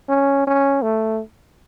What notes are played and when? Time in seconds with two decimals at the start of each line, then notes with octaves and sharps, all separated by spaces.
0.09 C#4
0.47 C#4
0.82 A3